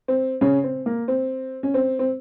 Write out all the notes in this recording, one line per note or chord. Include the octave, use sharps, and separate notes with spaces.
C4
C#3 C#4
C4
A#3
C4
C#4
C4
C4